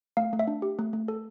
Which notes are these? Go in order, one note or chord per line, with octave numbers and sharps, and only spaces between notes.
A3 F5
A3
E5
D4
G4
A3
A3
A4